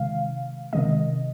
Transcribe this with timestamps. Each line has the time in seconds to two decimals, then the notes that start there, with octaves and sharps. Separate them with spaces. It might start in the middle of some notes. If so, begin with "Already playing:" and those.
Already playing: C3 D#3 G#3 F5
0.73 C3 D#3 G#3 D#5